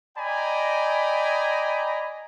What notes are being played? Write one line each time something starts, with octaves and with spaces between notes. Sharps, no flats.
D5 D#5 G5 G#5 A#5 B5